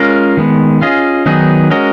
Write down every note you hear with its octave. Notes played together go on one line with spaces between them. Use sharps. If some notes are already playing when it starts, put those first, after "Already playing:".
Already playing: G#3 C#4 F4 A#4
D#3 G#3 B3
C#4 F4 G#4 D#5
D#3 F#3 B3 D#4 G#4
G#3 C#4 F#4 A#4 D#5